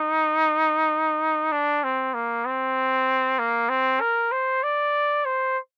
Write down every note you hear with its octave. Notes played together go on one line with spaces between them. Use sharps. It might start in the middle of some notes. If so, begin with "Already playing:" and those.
Already playing: D#4
D4
C4
A#3
C4
A#3
C4
A#4
C5
D5
C5